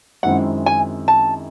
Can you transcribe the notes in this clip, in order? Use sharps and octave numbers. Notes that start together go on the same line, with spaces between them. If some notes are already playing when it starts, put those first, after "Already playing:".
F#2 D#3 G#3 C4 E4 F#5
G#5
A5